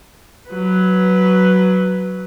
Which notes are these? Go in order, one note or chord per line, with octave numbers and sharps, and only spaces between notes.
F#3 B4